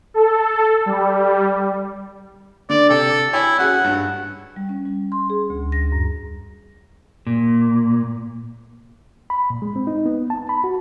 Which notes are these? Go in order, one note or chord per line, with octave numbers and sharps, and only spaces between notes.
A4
G3
D3 D5
C3 A4 G5
E4 C#5 G5 G#5
C#4 F#4 G#4 F#5
G2
G3
C#4
G3
C6
G#4
D2
A#6
F#2
A#2
B5
A#2
G#3
C4
D#4
B3
A5
B5
F#4